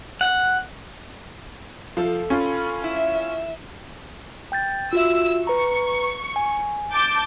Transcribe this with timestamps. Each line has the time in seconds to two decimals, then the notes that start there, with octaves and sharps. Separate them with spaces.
0.21 F#5
1.97 F3 A4 F5
2.30 C#4 F4 B5
2.84 E4 E5
4.52 G5 G6 A6
4.93 F4 F#4 E5 E6
5.47 B4 A#5 C#6
6.36 G#5
6.92 A5 D6 G6